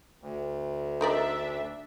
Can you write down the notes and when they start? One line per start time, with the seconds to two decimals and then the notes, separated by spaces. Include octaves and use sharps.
0.22 D2
1.01 D4 D#4 A#4 D5 E5